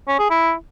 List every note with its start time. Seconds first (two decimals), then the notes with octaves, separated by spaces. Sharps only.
0.08 C#4
0.19 G#4
0.30 E4